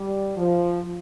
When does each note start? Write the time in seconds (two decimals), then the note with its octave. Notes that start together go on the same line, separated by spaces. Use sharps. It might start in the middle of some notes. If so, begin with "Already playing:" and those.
Already playing: G3
0.37 F3